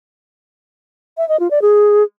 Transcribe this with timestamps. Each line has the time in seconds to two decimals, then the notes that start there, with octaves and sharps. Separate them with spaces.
1.18 E5
1.29 D#5
1.40 F4
1.51 D5
1.62 G#4